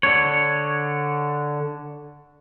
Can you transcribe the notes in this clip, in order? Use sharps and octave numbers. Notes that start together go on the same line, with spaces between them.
D3 D4 C#5